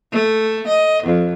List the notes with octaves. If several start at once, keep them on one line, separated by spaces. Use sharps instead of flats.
A3
D#5
F2